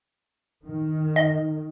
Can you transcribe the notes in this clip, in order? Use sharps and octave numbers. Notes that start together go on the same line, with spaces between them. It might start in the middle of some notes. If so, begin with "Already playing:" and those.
D#3
D#5